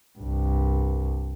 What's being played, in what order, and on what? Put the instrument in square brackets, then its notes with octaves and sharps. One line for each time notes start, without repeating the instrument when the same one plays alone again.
[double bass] C2 G2